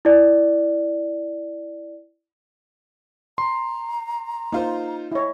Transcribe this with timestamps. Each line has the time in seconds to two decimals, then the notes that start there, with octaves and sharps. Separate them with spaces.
0.05 E4 D5
3.38 A#5 C6
4.52 A#3 D#4 F4 C5
5.12 E4 C#5 D#5